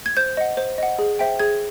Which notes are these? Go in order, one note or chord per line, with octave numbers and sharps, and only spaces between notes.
G#6
C5 G6
D#5 F#5
C5
D#5 F#5
G#4
C5 E5 G5
G#4 G#6